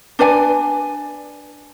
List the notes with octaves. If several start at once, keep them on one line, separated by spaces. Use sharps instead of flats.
D4 B4 D5 G#5